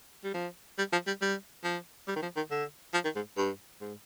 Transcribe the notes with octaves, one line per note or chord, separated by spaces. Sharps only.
G3
F3
G3
F3
G3
G3
F3
G3
D#3
F3
D#3
D3
F3
D#3
G#2
G2
G#2